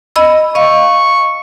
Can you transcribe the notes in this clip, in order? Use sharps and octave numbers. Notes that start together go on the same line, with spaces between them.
D#5 B5 E6
D#5 F5 C#6